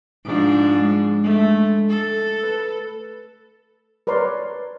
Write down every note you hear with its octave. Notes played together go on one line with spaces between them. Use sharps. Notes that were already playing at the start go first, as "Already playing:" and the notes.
G#2 F3 D4 D7
G#3
A3
A4
B4
A#4 B4 C#5 D5 C6